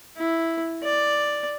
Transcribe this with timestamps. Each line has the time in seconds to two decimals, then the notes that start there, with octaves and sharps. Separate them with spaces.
0.17 E4
0.83 D5